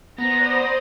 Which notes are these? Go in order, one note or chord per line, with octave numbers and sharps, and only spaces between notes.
B3 C5 D5 A#5 D#6